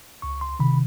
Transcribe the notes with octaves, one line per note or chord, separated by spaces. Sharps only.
C#2 C#6
C6
C3 D#3 B5